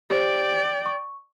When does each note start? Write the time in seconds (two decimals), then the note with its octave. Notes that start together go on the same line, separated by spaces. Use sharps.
0.10 G4 C5 D5 G5
0.86 C#6